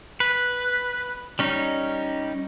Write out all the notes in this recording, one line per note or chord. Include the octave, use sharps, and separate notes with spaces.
B4
G3 C#4 D#4